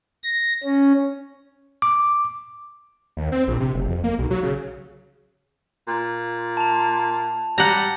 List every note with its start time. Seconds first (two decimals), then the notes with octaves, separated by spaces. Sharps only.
0.24 A#6
0.64 C#4
1.82 D6
3.17 D#2
3.32 C4
3.48 A#1
3.60 C3
3.75 F#1
3.88 F2
4.04 A#3
4.19 B1
4.31 F#3
4.43 C#3
5.88 A#2
6.57 A5 F7
7.58 G3 F#5 A#5